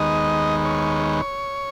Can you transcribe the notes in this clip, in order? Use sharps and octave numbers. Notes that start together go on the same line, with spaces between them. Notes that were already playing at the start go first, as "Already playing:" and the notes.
Already playing: D#2 D#3 G#3 B3 D#5
C#5